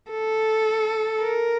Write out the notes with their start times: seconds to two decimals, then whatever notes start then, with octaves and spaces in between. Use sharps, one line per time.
0.12 A4
1.20 A#4